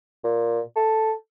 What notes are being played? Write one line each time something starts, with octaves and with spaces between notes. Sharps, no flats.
A#2
A4